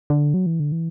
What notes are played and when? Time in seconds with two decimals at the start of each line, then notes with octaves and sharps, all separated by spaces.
0.10 D3
0.34 F#3
0.46 E3
0.60 D3
0.72 E3